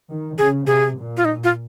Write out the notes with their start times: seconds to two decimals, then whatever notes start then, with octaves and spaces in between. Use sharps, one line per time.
0.10 D#3
0.38 C#3 G#4
0.67 C3 G#4
0.96 A#2
1.17 F4
1.25 D#4
1.44 F4